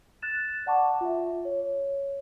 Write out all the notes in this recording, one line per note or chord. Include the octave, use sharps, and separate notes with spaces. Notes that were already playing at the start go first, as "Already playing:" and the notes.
F#6 A6 E7
D5 F#5 A5 C#6 D6
F4 E5
C#5